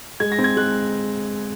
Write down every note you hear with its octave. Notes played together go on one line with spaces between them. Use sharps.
G#3 G#6
A#6
C4
G#6
G#3 F#6